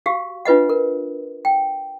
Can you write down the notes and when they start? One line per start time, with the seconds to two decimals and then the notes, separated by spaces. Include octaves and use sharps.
0.06 F#4 G4 F5
0.45 D4 F4 B4 D#5 F#5
0.69 A#4
1.45 G5